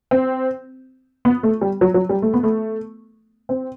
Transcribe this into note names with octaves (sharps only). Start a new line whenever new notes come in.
C4
B3
A3
G3
F#3
F#3
G3
A3
B3
A3
C4